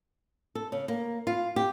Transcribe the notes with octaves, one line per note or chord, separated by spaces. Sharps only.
A4
C#3
A#3
F4
G4